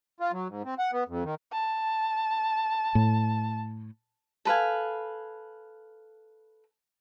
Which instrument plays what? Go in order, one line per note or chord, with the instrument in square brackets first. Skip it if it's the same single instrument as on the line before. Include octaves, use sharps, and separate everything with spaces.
[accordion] F4
F#3
G#2
C4
F#5
B3
F2
D#3
[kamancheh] A5
[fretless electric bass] A2
[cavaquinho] A4 B4 F5 G#5